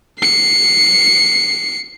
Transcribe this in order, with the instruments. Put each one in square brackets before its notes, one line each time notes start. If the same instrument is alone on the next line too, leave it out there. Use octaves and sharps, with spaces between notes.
[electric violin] C7 C#7